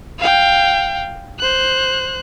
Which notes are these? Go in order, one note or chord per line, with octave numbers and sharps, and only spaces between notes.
F5 G5
C5 F#6